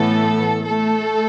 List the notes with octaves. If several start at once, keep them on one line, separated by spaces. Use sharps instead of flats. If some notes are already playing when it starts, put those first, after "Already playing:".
Already playing: A2 E3 A3 B3 A4
A3 A4